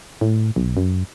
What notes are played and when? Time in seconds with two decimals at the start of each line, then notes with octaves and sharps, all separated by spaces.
0.21 A2
0.56 B1
0.77 F#2